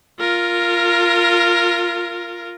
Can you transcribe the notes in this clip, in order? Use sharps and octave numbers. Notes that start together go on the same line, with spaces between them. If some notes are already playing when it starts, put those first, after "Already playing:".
F4 A#4